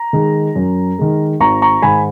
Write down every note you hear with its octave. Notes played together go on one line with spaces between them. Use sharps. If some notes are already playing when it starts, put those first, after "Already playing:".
Already playing: A#5
D#3 G#3
F#2
D#3 G#3
G#1 A#5 C#6
A#5 C#6
G#2 D#3 G#5 B5